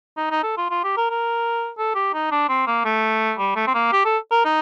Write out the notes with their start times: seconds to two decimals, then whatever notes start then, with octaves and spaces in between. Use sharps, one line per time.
0.17 D#4
0.31 D#4
0.43 A4
0.57 F4
0.71 F4
0.84 G4
0.97 A#4
1.10 A#4
1.78 A4
1.95 G4
2.14 D#4
2.32 D4
2.49 C4
2.67 A#3
2.85 A3
3.38 G3
3.56 A3
3.67 C4
3.74 A#3
3.92 G4
4.05 A4
4.31 A#4
4.45 D#4